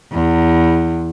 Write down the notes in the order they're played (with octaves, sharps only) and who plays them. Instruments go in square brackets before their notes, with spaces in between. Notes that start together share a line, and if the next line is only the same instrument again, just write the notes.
[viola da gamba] E2